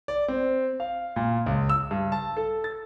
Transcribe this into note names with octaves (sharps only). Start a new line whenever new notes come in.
D5
C4
F5
A#2
C#2
E6
G2
A5
A4
A6